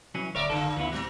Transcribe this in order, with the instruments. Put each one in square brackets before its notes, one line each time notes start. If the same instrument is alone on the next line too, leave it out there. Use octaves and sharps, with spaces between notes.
[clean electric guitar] C2 F#3 C#4 [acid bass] E3
[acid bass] D1 [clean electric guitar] D2 C#5 [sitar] A#4 D5 E5
[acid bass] F#1 [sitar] A#2 D3 A#3 [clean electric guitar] A4
[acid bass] D2 [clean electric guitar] E3 B3 E4
[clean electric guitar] C2 A2 C4 [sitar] F#3